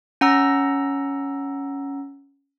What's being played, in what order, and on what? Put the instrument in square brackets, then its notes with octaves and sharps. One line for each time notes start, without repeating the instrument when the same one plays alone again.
[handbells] C#4 F#5 A#5 E6 A#6